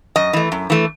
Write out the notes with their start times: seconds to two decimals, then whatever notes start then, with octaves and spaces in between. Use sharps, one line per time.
0.16 F#2 D#5
0.33 E3 A3
0.52 F#2
0.70 E3 A3